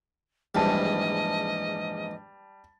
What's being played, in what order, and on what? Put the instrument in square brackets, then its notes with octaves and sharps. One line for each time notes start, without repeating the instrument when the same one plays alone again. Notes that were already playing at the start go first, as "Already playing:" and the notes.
[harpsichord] A#1 E2 G#2 [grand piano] G3 A5 [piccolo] D#5